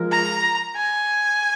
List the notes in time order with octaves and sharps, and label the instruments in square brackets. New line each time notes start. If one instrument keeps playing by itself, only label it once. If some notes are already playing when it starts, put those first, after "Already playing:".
Already playing: [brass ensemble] F3 G#3 F4 A#4
[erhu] A#5
G#5